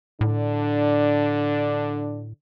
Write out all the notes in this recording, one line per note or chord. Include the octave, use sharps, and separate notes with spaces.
A2 D3 D4